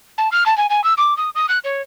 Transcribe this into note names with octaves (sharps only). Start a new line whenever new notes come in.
A5
F6
A5
G#5
G#5
E6
D6
D#6
D#6
F#6
C#5